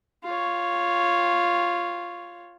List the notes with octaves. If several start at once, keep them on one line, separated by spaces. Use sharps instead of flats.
F4 C#5